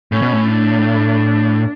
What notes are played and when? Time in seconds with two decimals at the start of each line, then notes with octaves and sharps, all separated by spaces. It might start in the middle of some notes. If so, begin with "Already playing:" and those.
0.12 A2 C#4
0.22 B2
0.33 A2
0.49 D4